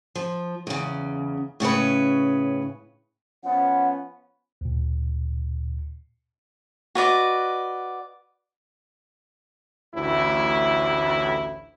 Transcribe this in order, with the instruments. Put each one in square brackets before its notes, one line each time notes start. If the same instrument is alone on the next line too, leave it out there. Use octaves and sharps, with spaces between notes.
[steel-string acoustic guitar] F3
E2 C#3
A2 C#3 C#4 B4
[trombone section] F3 B3 C#4 [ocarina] F#5
[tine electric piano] D2 A#2
[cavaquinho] F#4 B4 D5 D#5
[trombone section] A1 D2 A2 E4